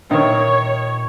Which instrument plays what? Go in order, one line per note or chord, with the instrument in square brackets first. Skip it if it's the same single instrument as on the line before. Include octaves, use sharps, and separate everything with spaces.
[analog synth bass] A#2 [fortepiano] D#3 [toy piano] A#4 B4 E5 [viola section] C#5